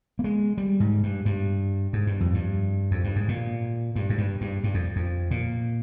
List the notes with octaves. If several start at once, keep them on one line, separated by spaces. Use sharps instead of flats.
A#3
G#3
G3
G#2
G2
G2
G#2
G2
F2
G2
F2
G2
G#2
A#2
G2
G#2
G2
G2
G2
F2
F2
A#2